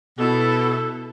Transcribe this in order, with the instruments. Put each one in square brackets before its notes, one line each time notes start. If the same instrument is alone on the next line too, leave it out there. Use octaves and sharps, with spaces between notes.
[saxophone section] B2 [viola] E4 A4